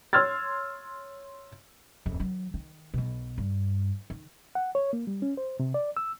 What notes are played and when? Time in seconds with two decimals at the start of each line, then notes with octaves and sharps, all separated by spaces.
0.13 C#5 C6 E6 F6 G#6 A6
2.06 D1 F2
2.20 D#3 F#3
2.54 D#3
2.94 B1 B2
3.38 G2
4.10 D#3
4.55 F#5
4.75 C#5
4.93 A#3
5.07 G3
5.22 C#4
5.37 C5
5.60 C3
5.74 D5
5.97 E6